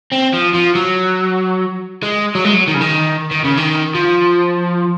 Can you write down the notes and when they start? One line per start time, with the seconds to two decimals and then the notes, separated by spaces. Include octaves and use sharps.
0.12 C4
0.33 F3
0.54 F3
0.75 F#3
2.03 G#3
2.35 F#3
2.45 G#3
2.54 F#3
2.67 D#3
2.75 C#3
2.81 D#3
3.31 D#3
3.45 C#3
3.58 D#3
3.95 F3